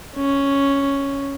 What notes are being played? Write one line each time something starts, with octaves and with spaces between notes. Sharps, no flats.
C#4